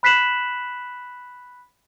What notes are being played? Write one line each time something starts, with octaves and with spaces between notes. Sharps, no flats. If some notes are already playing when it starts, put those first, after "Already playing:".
B5 F#6 B6 C7 E7 F#7